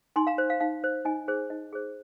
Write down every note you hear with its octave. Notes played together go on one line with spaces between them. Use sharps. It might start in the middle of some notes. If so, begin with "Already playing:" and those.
D#4 G#5 C6
F5 A#5
C5
F5
D#4 F5
C5
D#4 D#5 G#5
G#4 C5
D#4 D#5
G#4 C5